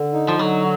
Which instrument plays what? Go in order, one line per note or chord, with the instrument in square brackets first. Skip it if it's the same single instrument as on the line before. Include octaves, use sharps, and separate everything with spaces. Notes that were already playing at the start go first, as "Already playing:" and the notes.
Already playing: [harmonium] D3
D#4
[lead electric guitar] F3
[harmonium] D3 [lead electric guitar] F#3